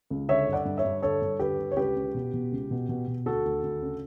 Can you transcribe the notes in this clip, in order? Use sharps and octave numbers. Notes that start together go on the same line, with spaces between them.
C#2
D3 C#5 E5
G2
D5 F#5
G2
C#5 E5
G2
D3 A4 C#5
G2
D3 G4 B4
D3
C#5
C#2 G4 B4
C#2
B2
B2
C#2
B2
B2
B2
D2 F#4 A4
D2
D2
C#3